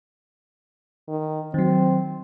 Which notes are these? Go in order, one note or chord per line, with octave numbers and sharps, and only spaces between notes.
D#3
D#3 F#3 C4